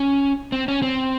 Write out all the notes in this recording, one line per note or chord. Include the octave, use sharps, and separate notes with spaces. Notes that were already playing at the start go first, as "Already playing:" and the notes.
Already playing: C#4
C4
C#4
C4